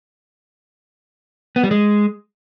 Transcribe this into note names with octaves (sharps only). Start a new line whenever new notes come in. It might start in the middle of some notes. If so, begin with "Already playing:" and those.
B3
G3
G#3